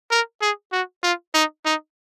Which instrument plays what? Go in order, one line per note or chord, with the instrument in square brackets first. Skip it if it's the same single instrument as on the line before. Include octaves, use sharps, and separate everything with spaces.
[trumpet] A#4
G#4
F#4
F4
D#4
D#4